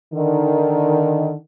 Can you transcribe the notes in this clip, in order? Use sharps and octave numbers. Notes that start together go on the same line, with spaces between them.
D3 D#3